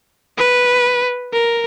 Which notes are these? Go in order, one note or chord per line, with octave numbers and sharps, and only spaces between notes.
B4
A#4